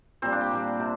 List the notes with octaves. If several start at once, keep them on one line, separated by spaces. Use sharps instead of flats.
A#2 G3 C4
D4
G4
A#2 G3
C3